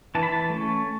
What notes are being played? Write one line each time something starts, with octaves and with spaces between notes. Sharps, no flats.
E3 A5
B5
A5
A3 C#4